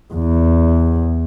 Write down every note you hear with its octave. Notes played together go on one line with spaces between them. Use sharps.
E2